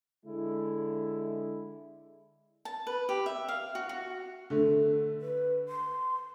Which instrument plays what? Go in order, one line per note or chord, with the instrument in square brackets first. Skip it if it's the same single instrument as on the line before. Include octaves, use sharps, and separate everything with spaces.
[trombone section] D3 G#3 E4
[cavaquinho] A5
B4
G4
E5
F5
F#4
F#4
[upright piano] D3 A3
[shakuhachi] B4
C6